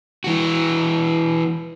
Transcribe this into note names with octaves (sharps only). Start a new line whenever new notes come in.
E3 F#4